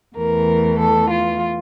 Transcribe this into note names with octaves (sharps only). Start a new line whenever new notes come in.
E2 E3 A3 A#4
A4
F4